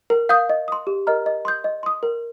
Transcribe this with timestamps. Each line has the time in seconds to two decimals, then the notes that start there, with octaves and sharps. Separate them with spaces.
0.10 A#4
0.29 F5 D#6 G6
0.49 D#5
0.68 C6 D#6
0.87 G4
1.07 A#4 D#5 A#5 F6
1.26 D#5
1.45 C6 D#6 G6
1.64 D#5
1.83 C6 D#6
2.03 A#4